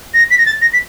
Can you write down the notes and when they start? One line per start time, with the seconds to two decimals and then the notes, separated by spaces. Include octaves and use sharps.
0.14 A#6
0.31 B6
0.38 A#6
0.46 A6
0.62 A#6
0.73 B6